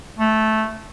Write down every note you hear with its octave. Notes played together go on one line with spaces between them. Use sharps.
A3